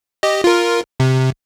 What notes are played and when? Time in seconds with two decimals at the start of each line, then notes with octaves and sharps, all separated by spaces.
0.23 G4 D#5
0.44 F4 A#4
1.00 C3